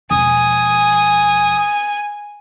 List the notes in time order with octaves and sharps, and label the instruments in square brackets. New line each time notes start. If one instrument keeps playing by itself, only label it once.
[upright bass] E1 F3 [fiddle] G#5 [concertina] D#6